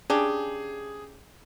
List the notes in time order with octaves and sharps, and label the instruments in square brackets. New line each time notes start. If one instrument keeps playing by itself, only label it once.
[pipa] C#3 D4 G4 [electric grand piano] G#4